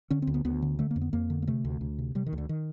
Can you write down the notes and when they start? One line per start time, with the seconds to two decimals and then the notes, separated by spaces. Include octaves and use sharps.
0.10 D3 C#4
0.22 C4
0.27 D2
0.34 B3
0.45 D2 B3
0.62 D3
0.79 D3 A3
0.91 A#3
0.96 F2
1.01 B3
1.13 F2 A#3
1.30 D3
1.42 A#3
1.47 C3 A3
1.65 D2
1.81 D2
1.99 C3
2.15 C3 G3
2.27 D#3
2.33 D2
2.38 D3
2.49 D#3